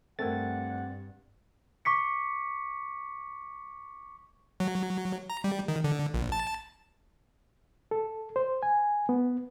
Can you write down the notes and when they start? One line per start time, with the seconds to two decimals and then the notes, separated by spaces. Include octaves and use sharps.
0.19 G2 A3 C4 A#4 F#5 G#6 A6
1.85 C#6 D6 B6 C#7
4.60 F#3
5.30 A#5
5.44 G3
5.68 D#3
5.84 D3
6.14 A#1
6.32 A5
7.91 A4
8.36 C5
8.63 G#5
9.09 B3